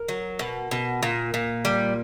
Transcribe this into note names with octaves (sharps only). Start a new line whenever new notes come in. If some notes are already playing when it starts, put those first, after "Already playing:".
Already playing: A#4
F#3
B2
B2
A#2
A#2
G3